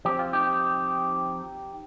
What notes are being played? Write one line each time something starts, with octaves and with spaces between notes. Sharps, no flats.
F3 C4 G4
F4
D#4 G4